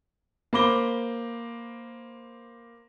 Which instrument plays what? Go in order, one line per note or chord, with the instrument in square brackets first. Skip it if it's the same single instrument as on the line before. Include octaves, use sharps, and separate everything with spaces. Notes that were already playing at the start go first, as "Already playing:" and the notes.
[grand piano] A#3 C5 B5 D6 A#6 G7